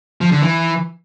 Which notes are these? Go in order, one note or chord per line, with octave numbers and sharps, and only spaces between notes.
F3
D3
E3